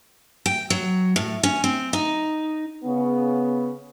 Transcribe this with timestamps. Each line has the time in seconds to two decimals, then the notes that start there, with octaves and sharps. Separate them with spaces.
0.46 G5
0.70 F#3
1.16 A2
1.43 C#4
1.64 C4
1.93 D#4
2.84 C#3 B3